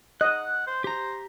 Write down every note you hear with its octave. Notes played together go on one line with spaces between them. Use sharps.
D#5 F#5 F#6
C5
G4 C5 A#5